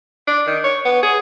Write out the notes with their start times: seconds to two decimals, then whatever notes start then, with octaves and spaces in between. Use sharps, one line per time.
0.27 D4
0.47 D#3
0.64 C#5
0.85 B3
1.03 G#4